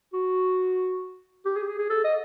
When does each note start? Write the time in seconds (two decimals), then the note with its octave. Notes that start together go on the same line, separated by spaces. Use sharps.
0.13 F#4
1.45 G4
1.56 G#4
1.62 G4
1.68 G#4
1.79 G#4
1.90 A4
2.04 D#5